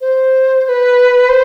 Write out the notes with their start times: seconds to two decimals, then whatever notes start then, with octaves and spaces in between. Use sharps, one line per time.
0.01 C5
0.65 C5
0.69 B4
1.29 C5